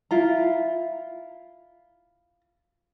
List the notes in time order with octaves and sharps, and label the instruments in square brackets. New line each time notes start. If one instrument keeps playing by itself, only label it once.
[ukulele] E4 F4 A#5